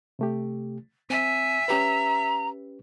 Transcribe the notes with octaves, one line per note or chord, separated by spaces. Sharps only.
C3 A3 G4
C4 E5 G#5
C#4 G4 B4 A#5